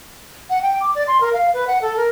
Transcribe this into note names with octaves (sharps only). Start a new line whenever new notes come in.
F#5
G5
D6
D5
C6
A#4
F5
B4
F#5
A4
A#4